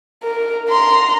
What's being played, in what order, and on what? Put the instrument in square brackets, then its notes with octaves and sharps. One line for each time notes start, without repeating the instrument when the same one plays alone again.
[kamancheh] A#4
[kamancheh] A#5 [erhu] C6